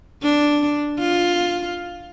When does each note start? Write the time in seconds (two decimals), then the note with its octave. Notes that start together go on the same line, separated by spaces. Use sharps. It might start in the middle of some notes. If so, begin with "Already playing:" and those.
0.23 D4
0.99 F4